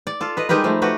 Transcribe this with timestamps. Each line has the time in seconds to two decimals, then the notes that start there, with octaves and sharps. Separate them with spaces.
0.07 D5
0.21 F4 A4
0.37 B4 D#5
0.49 G3 G#3 D#4 G4 A#4 B4
0.64 F3 A3
0.82 A3 F#4 G4 B4